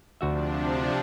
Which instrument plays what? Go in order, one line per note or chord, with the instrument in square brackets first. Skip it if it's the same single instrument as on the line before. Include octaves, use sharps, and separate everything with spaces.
[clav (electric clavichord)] D2 F#4 E5 [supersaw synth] C3 F3 D4